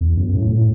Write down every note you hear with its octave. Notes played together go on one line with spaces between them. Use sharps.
E2
F#2
A2
A2